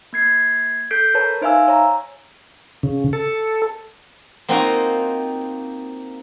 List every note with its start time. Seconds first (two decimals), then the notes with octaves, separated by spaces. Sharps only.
0.13 A#3 G#6 C7
0.91 A4 G6 B6 C7 D7
1.14 A#4 B4 C#5 A5
1.41 D#4 C5 E5 F5 G#5 E6
1.68 C#5 A#5
2.83 C#3
3.13 A4
4.49 A#3 C4 D#4 F4 F#4